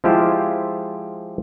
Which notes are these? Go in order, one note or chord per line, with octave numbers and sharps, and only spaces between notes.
F3 G#3 E4 F4 G4 C5